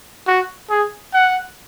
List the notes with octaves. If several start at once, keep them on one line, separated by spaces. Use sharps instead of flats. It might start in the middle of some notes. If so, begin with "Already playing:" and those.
F#4
G#4
F#5